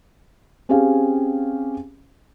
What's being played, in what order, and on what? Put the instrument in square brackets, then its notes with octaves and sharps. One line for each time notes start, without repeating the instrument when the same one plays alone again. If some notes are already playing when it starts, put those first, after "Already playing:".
[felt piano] C4 C#4 G4 G#4 F5